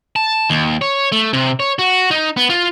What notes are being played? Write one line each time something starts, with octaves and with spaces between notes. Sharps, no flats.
A5
D#2
C#5
A3
C3
C#5
F#4
D#4
B3
F4